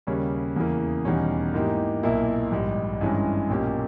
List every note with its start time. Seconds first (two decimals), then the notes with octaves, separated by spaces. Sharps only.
0.07 D#2 C#3 G3 C#4
0.56 E2 C#3 E3 A#3
1.05 E1 E2 D#3 G3 C#4
1.54 G#2 E3 A#3 D#4 G4
2.03 B1 A#2 A#3 E4
2.51 A#1 G#2 G3
3.01 G#1 G2 E3 G#3 C#4
3.49 B1 A#2 A#3 C#4 G4